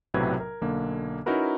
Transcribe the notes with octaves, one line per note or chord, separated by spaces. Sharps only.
B1 A2 C3 F#3 B4 G#6
A#4
B1 D3 A#3
C#4 D#4 E4 F#4 A#4 B4